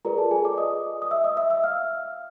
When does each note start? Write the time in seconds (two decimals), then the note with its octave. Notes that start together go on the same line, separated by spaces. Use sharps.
0.05 F4 G#4 A#4 B4 D5 A#5
0.18 A4 A5
0.31 G#4 G#5
0.45 D5 D6
0.58 D#5 D#6
1.02 D#6
1.11 E5 E6
1.24 D#5 D#6
1.37 E5 E6
1.50 E5 E6
1.64 F5 F6